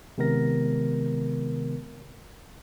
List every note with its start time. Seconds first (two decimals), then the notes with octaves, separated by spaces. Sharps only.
0.18 C3 D#3 G#3 B3 A#4 A#6